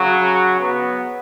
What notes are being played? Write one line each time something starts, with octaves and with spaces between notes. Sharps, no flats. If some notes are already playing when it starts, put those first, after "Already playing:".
Already playing: C#3 F#3
F#3 B3